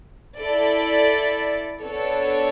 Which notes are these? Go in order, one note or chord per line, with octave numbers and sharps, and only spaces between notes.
E4 A4 D5
B3 D4 A4 C#5